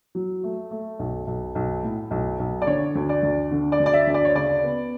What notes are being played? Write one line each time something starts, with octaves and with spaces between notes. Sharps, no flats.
F#3
A3
A3
B1
B1
B1
A2
B1
B1
D5
D3 C#5
D2
D5
D2
D3
D5
D2
D5
E5
D2
D5
C#5
C#3 D5
B3